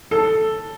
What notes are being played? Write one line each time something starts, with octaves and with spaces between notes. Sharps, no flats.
A4